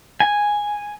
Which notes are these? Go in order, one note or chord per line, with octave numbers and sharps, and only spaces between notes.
G#5